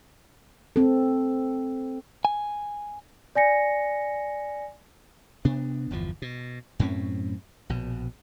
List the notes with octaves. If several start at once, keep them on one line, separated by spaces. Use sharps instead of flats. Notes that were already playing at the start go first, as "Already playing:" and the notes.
C4 A4
G#5
D5 G#5 A#6 C#7
C3 B3 D4
G1 E2 F3
B2
F#2 A2 C4 C#4
A#1 B2